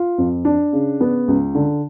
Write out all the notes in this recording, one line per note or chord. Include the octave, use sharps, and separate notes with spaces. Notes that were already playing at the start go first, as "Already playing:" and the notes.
Already playing: F4
F2
D4
C#3
B3
C#2
D3